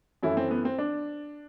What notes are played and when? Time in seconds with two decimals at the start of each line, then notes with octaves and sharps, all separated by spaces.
0.23 F#2 E3 A3 E4
0.37 C4
0.51 B3
0.65 C4
0.78 D4